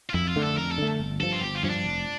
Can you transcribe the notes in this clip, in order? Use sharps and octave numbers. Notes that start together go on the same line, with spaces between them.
F4
F2 E4
F4
D3 A3
A4
F2 A#4
A4
D3 A3
G1
G2 F3 A4
F4
G1 G4
F4
G2 F3 C#4
D4
F1